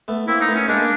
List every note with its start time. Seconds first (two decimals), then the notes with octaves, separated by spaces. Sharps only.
0.08 A3 B3
0.28 A#3 C4 E4
0.41 D#4
0.48 A3 B3
0.55 C#4
0.68 G#3 A#3 D4
0.81 A#3